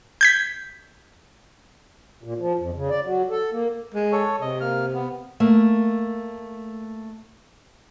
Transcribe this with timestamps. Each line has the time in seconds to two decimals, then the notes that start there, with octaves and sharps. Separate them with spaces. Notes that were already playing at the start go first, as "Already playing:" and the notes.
0.21 G6 G#6 B6
2.24 A#2
2.40 F3
2.60 F2
2.75 C#3
2.90 D5
3.04 F#3
3.31 A4
3.52 A#3
3.94 G#3
4.12 A4 C#5
4.41 C3 D#5
4.60 A#3 F6
4.94 B3
5.40 A3 A#3